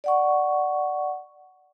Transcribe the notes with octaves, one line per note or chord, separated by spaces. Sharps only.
D5 F#5 C#6